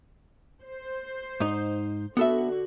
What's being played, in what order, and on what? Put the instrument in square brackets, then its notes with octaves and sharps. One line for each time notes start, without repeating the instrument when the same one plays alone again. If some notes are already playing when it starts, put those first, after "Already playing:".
[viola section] C5
[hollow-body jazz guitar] G#2 D#4
[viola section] D3 F#4 [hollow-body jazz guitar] B3 A4 E5